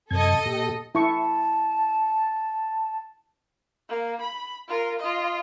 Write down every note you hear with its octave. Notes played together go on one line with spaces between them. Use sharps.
F#2 C3 A4 D#5 G#6
A#2 G4
E4 A5 C#6
A#3
B5
F4 A#4
F4 D#5